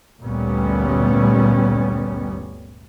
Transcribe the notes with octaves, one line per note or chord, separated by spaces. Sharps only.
G1 D2 A#2 G3 B3 C#4